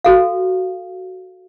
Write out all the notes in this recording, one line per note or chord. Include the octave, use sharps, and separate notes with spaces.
F#4 A4 F5